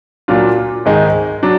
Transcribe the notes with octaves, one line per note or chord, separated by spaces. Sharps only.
A#2 F#3 D4 F4
G#2 D#3 G#3 D#4
F#3 D4